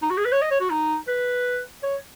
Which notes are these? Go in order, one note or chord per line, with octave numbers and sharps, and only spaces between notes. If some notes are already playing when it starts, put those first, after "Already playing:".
D#4
F#4
G#4
B4
C#5
D#5
C#5
F#4
D#4
B4
C#5